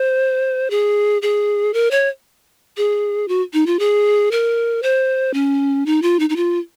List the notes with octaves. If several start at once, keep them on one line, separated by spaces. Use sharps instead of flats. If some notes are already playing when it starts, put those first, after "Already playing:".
Already playing: C5
G#4
G#4
A#4
C#5
G#4
F#4
D#4
F4
G#4
A#4
C5
C#4
D#4
F4
D#4
D#4
F4